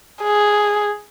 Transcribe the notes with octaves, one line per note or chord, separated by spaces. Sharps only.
G#4